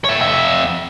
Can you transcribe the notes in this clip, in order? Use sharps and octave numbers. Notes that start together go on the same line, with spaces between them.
C#5 E5
F2 E5